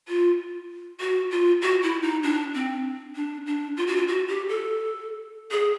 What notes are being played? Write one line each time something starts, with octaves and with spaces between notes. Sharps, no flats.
F4
F#4
F4
F#4
E4
D#4
D4
C4
D4
D4
F4
F#4
F4
F#4
G4
A4
G#4